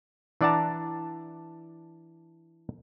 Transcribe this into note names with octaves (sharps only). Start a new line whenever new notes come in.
E3 D4 D5 F#5 A5 A#5